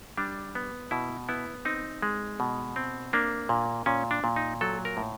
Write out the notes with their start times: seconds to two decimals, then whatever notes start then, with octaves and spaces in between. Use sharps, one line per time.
0.17 G3 D4
0.55 B3
0.91 B2 E4
1.29 B3 E4
1.65 C4 D#4
2.02 G#3
2.40 B2
2.76 C4
3.13 A#3 D4
3.49 A#2
3.86 A#2 C#4
4.11 D4
4.24 A#2
4.36 D#4
4.61 F#3 A4
4.85 A#4
4.97 A2